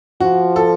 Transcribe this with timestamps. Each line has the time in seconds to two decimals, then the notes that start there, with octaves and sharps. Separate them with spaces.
0.20 F3 F#4
0.56 A4